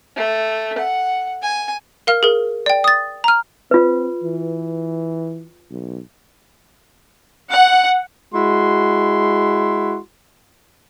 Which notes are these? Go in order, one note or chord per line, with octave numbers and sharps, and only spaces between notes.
A3
F#5
G#5
A#4 F5 F6
G#4 A#4
D5 G5
D#6 A6
A#5 F6
C4 F4 B4
E3
B1
F#5
G#3 E4 F#4 C6